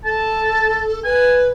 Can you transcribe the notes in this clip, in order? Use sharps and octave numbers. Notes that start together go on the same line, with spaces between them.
A4 A5
B4 G#5